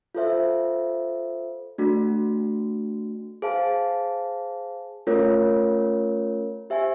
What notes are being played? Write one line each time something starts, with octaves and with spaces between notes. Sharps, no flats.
F4 A4 C5 E5
A3 D4 F#4
G#4 C5 F5 A5
A3 C#4 F4 A#4 C#5
G4 C5 E5 G#5